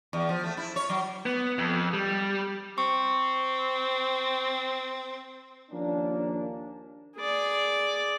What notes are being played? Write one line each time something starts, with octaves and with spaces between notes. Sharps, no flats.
E2
F3
A3
E4
C#5
F#3
B3
F2
G3
C4 C#6
D#2 F3 A#3 C#4 D4
G#4 D5